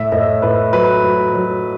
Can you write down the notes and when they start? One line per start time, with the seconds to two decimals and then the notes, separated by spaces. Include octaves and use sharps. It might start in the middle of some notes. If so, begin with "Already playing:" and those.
Already playing: A2 E5
0.12 A2 D#5
0.42 A2 B4
0.73 F#3 B4
1.03 F#3
1.34 F#3